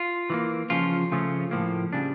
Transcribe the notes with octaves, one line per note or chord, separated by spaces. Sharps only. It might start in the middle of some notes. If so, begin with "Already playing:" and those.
Already playing: F4
E3 G3 A#3
C#3 F3 C#4 F4
C#3 F3 A3 C#4
A2 F3 A#3
C#3 G3 D4